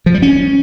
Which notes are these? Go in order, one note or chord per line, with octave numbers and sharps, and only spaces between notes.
F3
G3
C#4